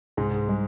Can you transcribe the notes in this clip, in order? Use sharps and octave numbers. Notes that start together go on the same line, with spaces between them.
C2 G#2 G#3
G3 G#3